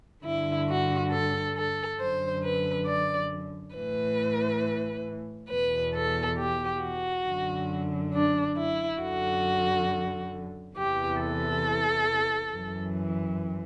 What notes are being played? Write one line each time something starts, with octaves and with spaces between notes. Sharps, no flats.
G2 D3 E4
F#4
A4
A4
F#2 D3 C5
B4
D5
A2 E3 B4
E2 B2 B4
A4
G4
F#4
F#2 D3
D4
E4
F#2 D3 F#4
E2 C3 E3 G4
A4
F#2 E3